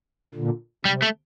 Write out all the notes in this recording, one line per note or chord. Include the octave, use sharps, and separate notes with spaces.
A#2 D3
C3 G3
A3